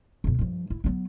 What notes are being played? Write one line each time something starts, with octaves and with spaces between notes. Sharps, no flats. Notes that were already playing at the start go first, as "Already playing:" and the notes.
B1 F2
G2 F3
E4
F#3 B3